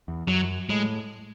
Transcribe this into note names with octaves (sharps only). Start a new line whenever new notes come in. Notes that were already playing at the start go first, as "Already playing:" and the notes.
E2
F#2 F#3
A2 G#3